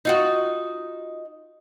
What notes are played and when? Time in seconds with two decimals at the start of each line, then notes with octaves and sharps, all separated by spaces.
0.05 D#4 F4 F#4